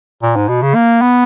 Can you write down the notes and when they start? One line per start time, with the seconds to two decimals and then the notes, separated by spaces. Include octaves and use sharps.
0.22 A#2
0.36 G#2
0.49 B2
0.62 C#3
0.75 A#3
1.02 B3